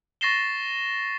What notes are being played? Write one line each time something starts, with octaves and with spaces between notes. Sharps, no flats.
C#6 A6 A#6 C7 E7 G7